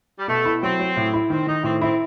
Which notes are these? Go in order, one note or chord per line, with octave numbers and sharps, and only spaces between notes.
G3
B2 A3
E4
F#3 C4
F#3
A2
E4
D#3 C4
D#3 D#4
A2 C4
C4 E4